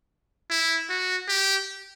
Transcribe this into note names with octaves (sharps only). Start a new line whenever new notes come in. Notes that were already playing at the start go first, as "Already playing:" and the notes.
E4
F#4
G4